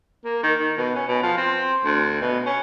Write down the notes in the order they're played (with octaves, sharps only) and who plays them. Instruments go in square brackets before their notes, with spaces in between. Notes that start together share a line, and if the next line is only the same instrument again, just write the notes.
[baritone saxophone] A#3
D#3
D#3
B2
C#4
B2
F3
C4
D2
B2
C#4